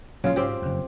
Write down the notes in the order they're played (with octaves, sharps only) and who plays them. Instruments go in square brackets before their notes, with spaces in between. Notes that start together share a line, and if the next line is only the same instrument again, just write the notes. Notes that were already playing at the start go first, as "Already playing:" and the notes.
[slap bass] A#1 F#3 [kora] C#3 F4
[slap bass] G#2 [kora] C4 G4
[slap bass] F#1 F2